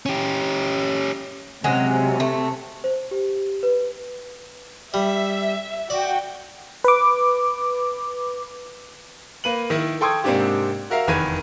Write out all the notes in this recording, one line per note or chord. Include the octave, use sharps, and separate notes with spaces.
C#4 G4
C3 F#3 G#3 C#4
A3
C5
G4
B4
G3 E5
F#4 D5 G5
B4 D6
A#3 B4 D#7 F#7
D#3 E4
A4 G5 C6 C#6 D#6 G#6
G#2 C3 A#3 C4 D4 G4
F#4 A#4 E5 F5
F1 E2 D#3 B4 G#6 D#7